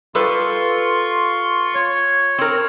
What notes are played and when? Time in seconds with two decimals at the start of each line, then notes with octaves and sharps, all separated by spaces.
0.15 G3 F4 A4 B4 C6 C#6
1.75 C#5
2.38 C4 A#4